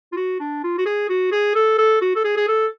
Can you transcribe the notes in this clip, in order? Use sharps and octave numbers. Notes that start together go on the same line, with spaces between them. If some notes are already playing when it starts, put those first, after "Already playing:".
F4
F#4
D4
F4
F#4
G#4
F#4
G#4
A4
A4
F#4
A4
G#4
G#4
A4